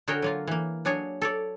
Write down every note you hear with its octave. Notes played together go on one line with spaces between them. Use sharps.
D3 F#4 G#4 A#4 C#5 G5
F#3 A#3 F4
E3 A#3
F#3 D4 G#4 C#5
A4 C#5 D5